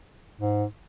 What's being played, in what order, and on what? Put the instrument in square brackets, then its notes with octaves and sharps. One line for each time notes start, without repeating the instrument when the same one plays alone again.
[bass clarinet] G#2